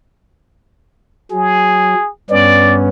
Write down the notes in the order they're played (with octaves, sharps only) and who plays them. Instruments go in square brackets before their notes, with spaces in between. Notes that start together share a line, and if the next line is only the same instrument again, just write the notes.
[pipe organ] F#3 [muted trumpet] G#4
[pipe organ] G2 B3 C#4 [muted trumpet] D5